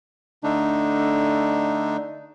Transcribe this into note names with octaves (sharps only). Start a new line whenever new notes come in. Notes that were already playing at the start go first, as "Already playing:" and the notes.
D3 A3 D4 D#4